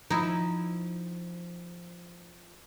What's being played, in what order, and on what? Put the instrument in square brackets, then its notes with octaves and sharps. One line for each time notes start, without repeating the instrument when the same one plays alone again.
[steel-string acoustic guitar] F3 [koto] D#4 E4